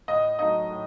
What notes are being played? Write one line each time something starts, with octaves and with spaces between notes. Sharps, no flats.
A2 D#5
F#3 A3 D#4 D#5
A2